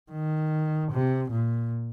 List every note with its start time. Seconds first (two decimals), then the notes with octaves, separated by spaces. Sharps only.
0.12 D#3
0.92 C3
1.32 A#2